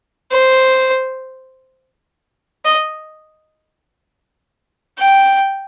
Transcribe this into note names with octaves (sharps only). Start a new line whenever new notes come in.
C5
D#5
G5